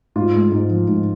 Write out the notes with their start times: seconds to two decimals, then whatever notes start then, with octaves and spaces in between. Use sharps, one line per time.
0.16 G#2 F4
0.35 G#3
0.52 G#2
0.70 F3
0.88 G#2